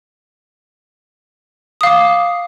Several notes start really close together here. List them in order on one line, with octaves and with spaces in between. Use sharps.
D#6 F5 D6